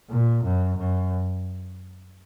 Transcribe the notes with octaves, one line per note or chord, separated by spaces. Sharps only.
A#2
F#2
F#2